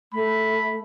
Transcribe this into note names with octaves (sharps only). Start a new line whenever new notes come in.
A3 B5